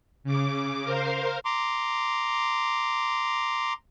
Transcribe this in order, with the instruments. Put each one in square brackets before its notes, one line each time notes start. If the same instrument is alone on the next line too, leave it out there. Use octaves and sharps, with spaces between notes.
[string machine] C#3 D6
A#4 C5 F5
[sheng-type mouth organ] A#5 C6 D6